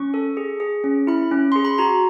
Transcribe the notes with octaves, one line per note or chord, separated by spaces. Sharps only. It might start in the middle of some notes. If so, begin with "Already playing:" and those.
Already playing: C#4 C#6
A4
G#4
G#4
C#4
E4 B5
C#4
G#4 C6
B5
F#4 A#5